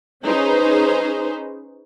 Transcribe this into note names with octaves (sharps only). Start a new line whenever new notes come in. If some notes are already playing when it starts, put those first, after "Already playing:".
C#4 D#4 G#4 B4 C5